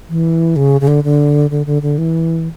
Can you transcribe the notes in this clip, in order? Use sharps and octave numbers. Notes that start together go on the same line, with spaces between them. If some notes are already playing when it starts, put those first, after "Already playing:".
E3
C#3
C#3
D3
D3
D3
D3
D3
E3